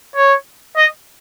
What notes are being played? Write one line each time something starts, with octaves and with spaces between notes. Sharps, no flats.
C#5
D#5